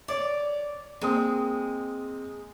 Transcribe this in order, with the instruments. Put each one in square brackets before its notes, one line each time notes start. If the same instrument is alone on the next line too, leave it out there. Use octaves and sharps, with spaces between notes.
[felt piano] C#5 [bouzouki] D5
[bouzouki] G#3 [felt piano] A#3 C4 D#6